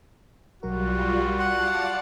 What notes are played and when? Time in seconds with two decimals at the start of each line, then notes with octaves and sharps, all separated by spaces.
0.63 B1 F#3 G3 F4 F#4 A#4
1.39 D5 F5 F#5 A5 C6